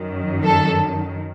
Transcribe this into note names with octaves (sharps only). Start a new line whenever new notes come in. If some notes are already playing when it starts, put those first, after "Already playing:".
Already playing: F#2 D#3
A4